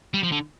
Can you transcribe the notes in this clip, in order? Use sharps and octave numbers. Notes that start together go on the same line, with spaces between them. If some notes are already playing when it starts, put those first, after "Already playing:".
G3
F3
D3